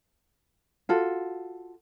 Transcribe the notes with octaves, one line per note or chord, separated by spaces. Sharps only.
F4 F#4 A4